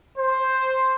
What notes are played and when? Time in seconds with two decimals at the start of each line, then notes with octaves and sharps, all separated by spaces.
0.17 C5